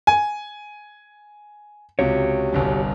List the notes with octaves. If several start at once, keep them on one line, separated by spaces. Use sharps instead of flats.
G#5
C#2 C3 F#4 G4 C#5
G1 C2 G2